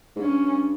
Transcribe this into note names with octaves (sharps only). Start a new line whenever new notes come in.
G#2
G2 C#4